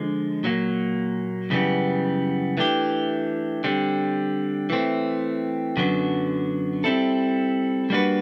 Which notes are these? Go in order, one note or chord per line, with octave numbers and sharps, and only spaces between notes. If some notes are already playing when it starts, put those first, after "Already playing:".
Already playing: D3 F3 G#3
A#2 F#3 A#3
F#2 C#3 E3 G3 B3
E3 A3 D4 G4
D3 G3 C4
E3 A3 C4
F#2 D3 F#3 B3 D4
G3 C4 E4 A4
G3 A#3 D4 F#4 B4